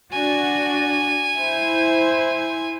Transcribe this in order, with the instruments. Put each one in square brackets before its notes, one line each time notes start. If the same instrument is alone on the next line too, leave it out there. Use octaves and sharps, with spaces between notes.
[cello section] D4 F#4 D5 [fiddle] G#5
[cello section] E4 C5